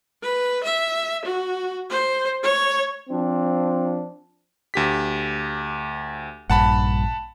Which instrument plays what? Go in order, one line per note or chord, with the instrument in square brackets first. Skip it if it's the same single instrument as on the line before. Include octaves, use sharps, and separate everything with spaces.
[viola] B4
E5
F#4
C5
C#5
[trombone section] F3 C4 D4
[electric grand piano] D2 G4 B6
[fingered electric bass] A#1 G2 [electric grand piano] F#5 A5 B5